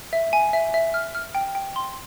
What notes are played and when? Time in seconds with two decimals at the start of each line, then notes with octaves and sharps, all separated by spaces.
0.13 E5
0.33 G#5
0.53 E5
0.74 E5
0.94 F6
1.15 F6
1.35 G5
1.55 G5
1.76 C6